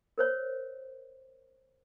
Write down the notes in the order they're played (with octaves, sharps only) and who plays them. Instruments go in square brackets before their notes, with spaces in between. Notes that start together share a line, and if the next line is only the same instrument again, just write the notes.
[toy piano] A#4 C5 C#5